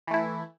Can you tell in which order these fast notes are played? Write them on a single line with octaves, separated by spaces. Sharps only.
E3 A3 E4